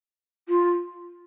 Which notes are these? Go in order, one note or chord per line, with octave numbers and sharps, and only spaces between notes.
F4